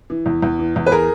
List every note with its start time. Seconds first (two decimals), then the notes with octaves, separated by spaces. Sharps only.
0.10 E3
0.26 E2
0.43 E2
0.59 E3
0.76 E2
0.86 B4
0.91 G#4 A#4